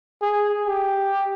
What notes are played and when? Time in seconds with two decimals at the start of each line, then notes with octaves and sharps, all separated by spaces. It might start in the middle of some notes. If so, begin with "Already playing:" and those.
0.22 G#4
0.67 G4